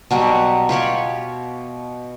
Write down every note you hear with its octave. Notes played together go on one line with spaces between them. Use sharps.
B2 F#3 G3
F4 G4 C#5 B5